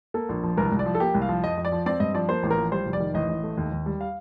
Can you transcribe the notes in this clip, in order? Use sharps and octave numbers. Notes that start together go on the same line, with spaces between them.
A#3 A4
A#1
F3
C2 A#4
C2
D5
F3
A4
A#3 G4
C2
F5
F3
F2 D#5
F2
D5
F3
C4 D5
G2 D#5
F3 D5
A#3 C5
A1
A#4
F3
G3 C5
F1
D5
D#3
A1 D#5
A1
A3
D#2
D#2
G3
F5